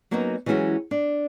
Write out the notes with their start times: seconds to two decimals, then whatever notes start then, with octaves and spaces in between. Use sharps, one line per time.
0.11 F#3 A#3 B3 C#4 D#4 F#4
0.46 E3 F#3 G#3 C#4 F#4 G4
0.91 D4